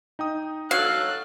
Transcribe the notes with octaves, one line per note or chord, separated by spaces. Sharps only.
D#4 G5 D#6
F#3 A4 F5 F#6